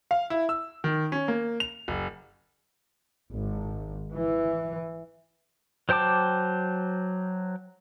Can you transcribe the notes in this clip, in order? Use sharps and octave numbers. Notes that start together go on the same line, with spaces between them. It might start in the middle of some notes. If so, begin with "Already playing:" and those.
F5
E4
E6
D#3
C#4
A#3
F7
F#1
G#1
E3
F#3 C5 G5 A5 D6